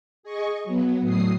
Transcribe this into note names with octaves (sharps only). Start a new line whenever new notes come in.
G#4 D#5 C#6
F#3 B3
A2 F#3 D#6 C7